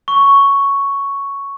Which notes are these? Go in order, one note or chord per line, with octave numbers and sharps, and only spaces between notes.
C#6